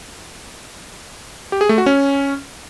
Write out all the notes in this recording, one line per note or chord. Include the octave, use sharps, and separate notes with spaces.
G4
G#4
A3
F#4
C#4